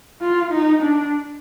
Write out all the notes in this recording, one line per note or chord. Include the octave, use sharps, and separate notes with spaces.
F4
D#4
D4